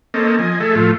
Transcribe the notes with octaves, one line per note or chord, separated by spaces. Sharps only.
A#3 C4 C#4 A4 D#5
F3 D#5 G#5
A3 G#4 A4 E5
A2 F3 A3 F4